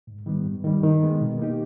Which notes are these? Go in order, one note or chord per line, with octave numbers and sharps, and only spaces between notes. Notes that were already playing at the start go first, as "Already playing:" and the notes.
G#2
D#3 G3 B3
G2
D#3 G3
D#3
G#3 B3
B2
A#3 D#4 G4